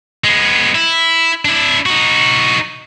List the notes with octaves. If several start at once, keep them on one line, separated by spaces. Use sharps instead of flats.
G#3 B3
E4
D4 E4
D#4 F#4